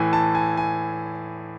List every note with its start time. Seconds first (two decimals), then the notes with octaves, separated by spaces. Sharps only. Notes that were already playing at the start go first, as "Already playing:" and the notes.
Already playing: A2 E3 G#5
0.13 A5
0.35 G#5
0.57 G#5